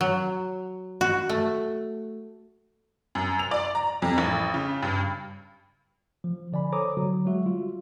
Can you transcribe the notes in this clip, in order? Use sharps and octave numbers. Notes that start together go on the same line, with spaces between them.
F#3
F#4
A3
F#2
F7
D5
A#5
F2
A1
C#3
G2
F3
D3 D5 G#5 B5
A4 C5 C#5 A#5 D6 D#6
D3 F#3 F#4
F#3 G#3 F#4 E5
G3 F4